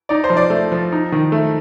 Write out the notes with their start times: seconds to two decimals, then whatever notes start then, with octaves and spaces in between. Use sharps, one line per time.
0.09 D#4 D5
0.24 C5
0.30 F3
0.37 D5
0.50 A3
0.72 F3
0.92 D#4
1.12 D#3
1.32 A3